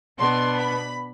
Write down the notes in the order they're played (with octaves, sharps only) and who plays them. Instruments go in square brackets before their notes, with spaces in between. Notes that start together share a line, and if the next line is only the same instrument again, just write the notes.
[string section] B2 B3 D4 C6
B5